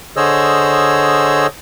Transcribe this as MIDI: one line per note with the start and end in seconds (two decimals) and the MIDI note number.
0.17 1.47 50
0.17 1.47 68
0.17 1.47 72
0.17 1.47 73
0.17 1.47 75
0.17 1.47 88